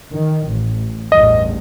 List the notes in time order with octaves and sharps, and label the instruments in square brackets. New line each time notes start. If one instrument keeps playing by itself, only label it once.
[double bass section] D#3
A1
[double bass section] A1 E2 G2 [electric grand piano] D#5